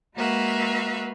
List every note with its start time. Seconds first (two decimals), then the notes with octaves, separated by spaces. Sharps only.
0.16 G#3 A#3 F#4 B4 E5 F5